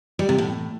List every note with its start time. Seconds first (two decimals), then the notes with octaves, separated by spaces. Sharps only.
0.19 G3
0.29 C3
0.38 A2